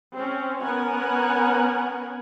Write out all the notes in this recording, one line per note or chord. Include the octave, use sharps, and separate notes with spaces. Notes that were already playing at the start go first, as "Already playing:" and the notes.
C4 C#4
B3 C#4 A#4 F#5 G#5